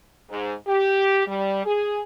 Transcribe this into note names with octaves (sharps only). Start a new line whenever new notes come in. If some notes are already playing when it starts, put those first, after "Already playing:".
G#2
G4
G3
G#4